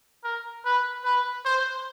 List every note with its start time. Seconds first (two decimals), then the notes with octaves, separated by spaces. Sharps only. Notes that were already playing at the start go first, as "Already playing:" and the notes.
0.24 A#4
0.65 B4
1.05 B4
1.45 C5